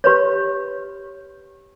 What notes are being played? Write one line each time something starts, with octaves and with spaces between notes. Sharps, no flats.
G4 B4 C#5